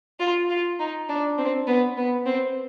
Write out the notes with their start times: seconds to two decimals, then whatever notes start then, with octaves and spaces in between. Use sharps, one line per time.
0.20 F4
0.49 F4
0.79 D#4
1.09 D4
1.38 C4
1.67 B3
1.97 B3
2.26 C4